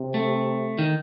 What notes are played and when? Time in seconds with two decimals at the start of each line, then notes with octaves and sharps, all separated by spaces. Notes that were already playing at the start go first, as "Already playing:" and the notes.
Already playing: C3
0.14 A3
0.79 D#3